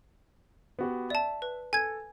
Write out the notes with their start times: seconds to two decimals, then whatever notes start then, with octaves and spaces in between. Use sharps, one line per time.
0.79 B3 F#4 G4
1.10 D5 E5 A5
1.42 B4
1.73 A4 G#5 G#6